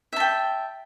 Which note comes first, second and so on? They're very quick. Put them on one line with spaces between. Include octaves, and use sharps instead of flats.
E5 A5 G5